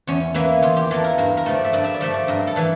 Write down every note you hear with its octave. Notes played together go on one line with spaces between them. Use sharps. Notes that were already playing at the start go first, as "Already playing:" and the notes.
E2 C#4
E3 A#3 E4
E2 F4
G4
E3 A#3 A4
A#4
G2 A#4
A#4
F3 A3
D5
E5
G2 D5
E5
D5
F3 A3 E5
D5
G2 A#4
A4
E3 G3